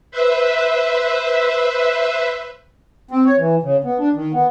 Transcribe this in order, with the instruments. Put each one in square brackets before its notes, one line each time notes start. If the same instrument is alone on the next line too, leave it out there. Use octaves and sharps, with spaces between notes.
[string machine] B4 C5 E5
[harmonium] C4
C#5
E3
C#3
B3
D4
D#3
B3